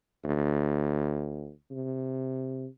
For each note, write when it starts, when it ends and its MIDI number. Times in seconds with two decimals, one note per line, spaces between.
0.25 1.51 38
1.71 2.67 48